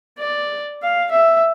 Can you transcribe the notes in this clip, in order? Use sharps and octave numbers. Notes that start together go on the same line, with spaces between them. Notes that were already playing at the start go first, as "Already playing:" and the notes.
D5
F5
E5